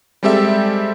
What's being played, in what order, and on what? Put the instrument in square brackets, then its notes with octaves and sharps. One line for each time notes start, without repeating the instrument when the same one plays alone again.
[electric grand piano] G3 G#3 C4 G4 A4 E5